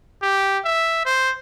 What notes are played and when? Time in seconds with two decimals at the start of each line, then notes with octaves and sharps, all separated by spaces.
0.22 G4
0.65 E5
1.06 C5